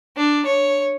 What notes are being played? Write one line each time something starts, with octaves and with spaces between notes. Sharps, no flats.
D4
C#5